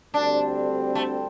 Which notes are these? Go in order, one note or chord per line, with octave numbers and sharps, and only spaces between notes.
D2 D3 G3 C4 D4 G4
A3